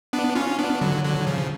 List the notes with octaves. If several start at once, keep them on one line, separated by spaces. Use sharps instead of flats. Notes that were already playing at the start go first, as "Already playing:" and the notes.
B3 D4
C#4 F4
B3 D4
D3 F#3
D3 F#3
C#3 F3